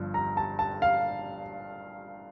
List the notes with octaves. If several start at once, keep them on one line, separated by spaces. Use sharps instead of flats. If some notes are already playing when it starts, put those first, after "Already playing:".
Already playing: G1 G2 F3
A#5
A5
A5
F5